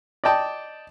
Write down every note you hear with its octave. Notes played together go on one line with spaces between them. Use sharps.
D5 D#5 G5 A5